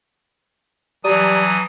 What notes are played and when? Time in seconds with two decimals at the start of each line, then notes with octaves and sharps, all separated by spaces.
1.05 E3 F#3 G3 A5 A#5 D#6